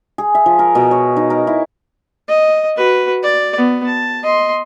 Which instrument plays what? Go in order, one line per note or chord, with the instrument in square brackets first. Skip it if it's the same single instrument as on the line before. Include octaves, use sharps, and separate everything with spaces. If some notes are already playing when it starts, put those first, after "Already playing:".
[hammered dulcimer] G#4
E5
F3
A#4
B2
C#5
D#4
A#4
E4
[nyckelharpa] D#5
F#4 B4
D5
B3
A5
D#5 C6